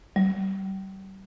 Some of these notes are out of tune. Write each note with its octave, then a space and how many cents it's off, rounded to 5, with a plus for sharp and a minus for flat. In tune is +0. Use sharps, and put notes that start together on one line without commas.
G3 -30